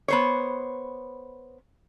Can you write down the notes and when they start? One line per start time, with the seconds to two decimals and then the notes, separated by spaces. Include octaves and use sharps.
0.08 B3 C5 C#5